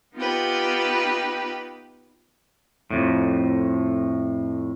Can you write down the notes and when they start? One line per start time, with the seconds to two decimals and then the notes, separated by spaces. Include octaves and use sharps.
0.14 B3 D#4 F4 G4 B4
2.91 F2 A2